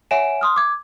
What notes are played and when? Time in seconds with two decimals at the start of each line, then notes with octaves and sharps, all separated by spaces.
0.11 C#5 E5 F#5 G#5 D7 E7
0.41 C6 D#6 F6
0.56 D6 G#6